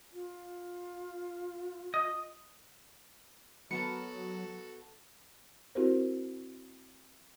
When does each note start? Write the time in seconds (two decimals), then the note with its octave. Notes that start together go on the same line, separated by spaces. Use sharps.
0.13 F4
1.94 D#5
3.71 F#3 B3 F#4 A4 A#4 A5 C#7
5.75 C4 E4 F#4 G4 A#4 C5